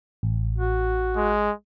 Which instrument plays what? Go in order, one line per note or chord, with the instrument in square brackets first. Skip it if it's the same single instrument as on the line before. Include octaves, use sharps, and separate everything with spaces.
[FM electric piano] A1
[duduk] F#4
[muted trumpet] G#3